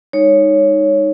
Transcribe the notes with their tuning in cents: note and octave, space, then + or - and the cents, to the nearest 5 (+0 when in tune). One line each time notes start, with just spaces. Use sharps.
G#3 -30 D#4 +0 C#5 +0